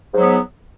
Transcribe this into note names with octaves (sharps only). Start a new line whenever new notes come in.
G#2 F#3 B3